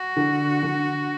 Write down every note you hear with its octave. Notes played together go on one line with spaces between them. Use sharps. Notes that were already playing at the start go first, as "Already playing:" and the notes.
Already playing: F#4
D3
D3